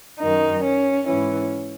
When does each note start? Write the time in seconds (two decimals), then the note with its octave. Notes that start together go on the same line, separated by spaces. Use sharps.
0.20 F#2 D#3 D#4
0.63 C#4
1.07 G#2 E3 C#4